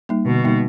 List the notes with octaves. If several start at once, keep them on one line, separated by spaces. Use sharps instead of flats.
G3 A#3 D#4
B2 D3
G3 A#3 D#4